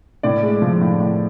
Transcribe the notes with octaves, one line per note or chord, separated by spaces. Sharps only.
A2 D5
G#3
F3
A2
A2